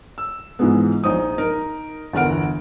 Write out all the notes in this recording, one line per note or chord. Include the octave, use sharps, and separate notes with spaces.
E6
G#2 E3 F3 G#3 B3
A#1 D#4 C5 D#6
D#4 A#4
G1 E2 A#4 F#5 F6 D7